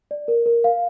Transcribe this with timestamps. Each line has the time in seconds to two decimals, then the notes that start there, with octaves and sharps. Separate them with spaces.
0.11 D5
0.28 A#4
0.46 A#4
0.64 F5